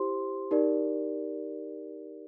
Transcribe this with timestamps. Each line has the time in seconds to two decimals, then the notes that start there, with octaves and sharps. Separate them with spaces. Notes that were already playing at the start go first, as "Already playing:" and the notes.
Already playing: E4 G4 C5 C6
0.51 D#4 G4 A#4 D5